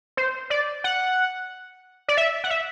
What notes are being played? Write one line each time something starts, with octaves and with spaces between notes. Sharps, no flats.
C5
D5
F#5
D5
E5
F#5
E5